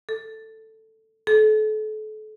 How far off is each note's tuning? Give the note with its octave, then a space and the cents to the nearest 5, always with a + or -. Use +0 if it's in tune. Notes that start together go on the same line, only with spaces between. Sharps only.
A4 +5
A4 -35